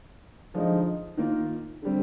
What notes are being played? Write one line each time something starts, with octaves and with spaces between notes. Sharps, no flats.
D3 F3 G#3 D#4
D#3 A#3 F4
D3 G3 C4